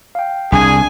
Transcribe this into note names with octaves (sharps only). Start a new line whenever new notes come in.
F5 G5
C2 D4 G#4 G#5